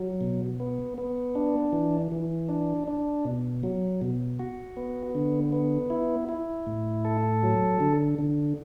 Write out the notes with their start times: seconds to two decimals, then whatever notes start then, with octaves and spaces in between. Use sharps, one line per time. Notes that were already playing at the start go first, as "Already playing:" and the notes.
Already playing: F#3
0.21 B2
0.60 B3
0.98 B3
1.35 D4
1.73 E3
2.12 E3
2.49 D4
2.88 D4
3.25 B2
3.63 F#3
4.02 B2
4.39 F#4
4.77 B3
5.15 D3
5.52 B3
5.90 E4
6.29 E4
6.67 A2
7.05 A4
7.43 F#3
7.80 D3
8.19 D3